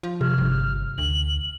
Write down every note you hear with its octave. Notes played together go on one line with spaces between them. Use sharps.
F3
C3 F6
G1
D2 F#7